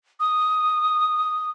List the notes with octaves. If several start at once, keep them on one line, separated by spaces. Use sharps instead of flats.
D#6